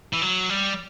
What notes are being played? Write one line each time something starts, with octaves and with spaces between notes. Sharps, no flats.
E3
F#3
G3